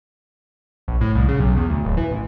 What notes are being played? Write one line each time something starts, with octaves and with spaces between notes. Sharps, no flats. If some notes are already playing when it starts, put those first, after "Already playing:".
A#1
A2
C2
C#3
B1
E2
D2
D1
E3
A1